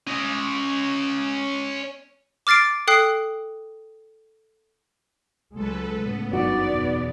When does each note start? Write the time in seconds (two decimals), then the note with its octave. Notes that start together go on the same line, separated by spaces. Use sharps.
0.07 C#4 D#5
2.47 D6 F6 A6 C7 D7
2.87 A4 G5 D#6 F#6 C7
5.55 C#2 F#3 G#3 A4 B4
6.01 A2 C#3 B3
6.33 G1 F#2 D#4 F#4 D5
6.67 E2 B2 E3